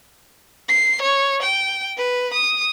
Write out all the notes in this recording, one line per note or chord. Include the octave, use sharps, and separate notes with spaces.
C7
C#5
G5
B4
D#6